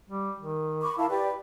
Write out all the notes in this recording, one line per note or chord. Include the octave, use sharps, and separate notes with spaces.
G3
D#3
B5 C#6 D6
E4 A#4 F5 A5
G4 B4 D5 G5